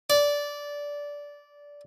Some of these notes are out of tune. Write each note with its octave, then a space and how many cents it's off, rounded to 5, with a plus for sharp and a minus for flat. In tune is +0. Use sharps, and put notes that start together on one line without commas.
D5 -15